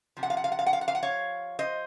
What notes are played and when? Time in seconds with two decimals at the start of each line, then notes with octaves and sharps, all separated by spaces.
0.17 C3 F3
0.23 F#5
0.30 F5
0.37 F#5
0.44 F5
0.52 F#5
0.59 F5
0.66 F#5
0.73 F5
0.81 F#5
0.88 F5
0.95 F#5
1.03 C#5 F5
1.59 C5 D#5